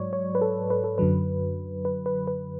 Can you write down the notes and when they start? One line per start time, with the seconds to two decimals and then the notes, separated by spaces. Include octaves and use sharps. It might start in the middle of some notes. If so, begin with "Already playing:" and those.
Already playing: G#2 F#3 C#5 D5
0.13 C#5
0.35 B4
0.41 A4
0.70 B4
0.84 A4
0.98 F#2 D3 F#3 B4
1.85 B4
2.06 B4
2.27 B4